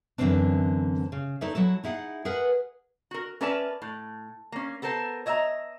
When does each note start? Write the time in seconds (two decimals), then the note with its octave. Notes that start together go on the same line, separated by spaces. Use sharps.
0.18 F#2 D3 E3 F#3 C4 D4
1.12 C#3
1.41 D#4 E4 A4 C#5 D5 E5
1.55 F#3 E4 F#4 A4
1.84 D#4 E4 G#4 F#5
2.25 G#4 A#4 B4 F#5
3.11 F#4 A#4
3.41 C#4 A#4 B4 D5 E5 A5
3.82 A2
4.52 A#3 C#4
4.82 B3 A4 A#4 C5 A5
5.26 C#5 D#5 E5 F#5 A#5